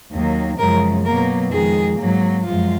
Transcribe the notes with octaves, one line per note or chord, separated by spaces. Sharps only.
D#2 D#3 F#3 A#3
F#2 C#3 F3 G#3 A#4
B2 F#3 A#3 A#4
F2 D#3 G#3 G#4
G#2 F#3 A#3
F#2 F3 G#3 F4